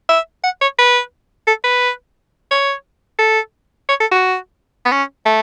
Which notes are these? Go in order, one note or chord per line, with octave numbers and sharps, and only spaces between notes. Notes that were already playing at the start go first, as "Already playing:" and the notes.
E5
F#5
C#5
B4
A4
B4
C#5
A4
C#5
A4
F#4
B3
C#4
A3